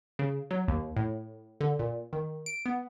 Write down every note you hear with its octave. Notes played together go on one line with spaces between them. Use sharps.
C#3
F#3
D#2
A2
D3
A#2
D#3
D7
B3